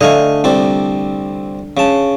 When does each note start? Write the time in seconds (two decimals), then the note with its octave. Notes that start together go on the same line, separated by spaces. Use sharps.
0.01 D3 A3 D#5 F5 G#5
0.44 C2 C4 D5
1.77 C#3 A5